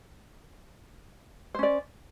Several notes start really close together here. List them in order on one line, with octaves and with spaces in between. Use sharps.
C5 C#4 D5